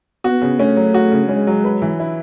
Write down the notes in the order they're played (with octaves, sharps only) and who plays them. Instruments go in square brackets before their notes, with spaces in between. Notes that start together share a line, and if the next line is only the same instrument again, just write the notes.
[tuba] B3 [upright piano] F#4
[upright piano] C#3
[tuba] A3 [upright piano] C#4
[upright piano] F#3
F#4
C#3
[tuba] G#3 [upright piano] C#4
[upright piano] F#3
B4
E3
E4